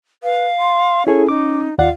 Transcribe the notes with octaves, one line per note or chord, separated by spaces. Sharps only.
B4 F5
C6
C#4 E4 G#4 A4 C#5
D#4 D6
D#2 F4 D5 F5 F#5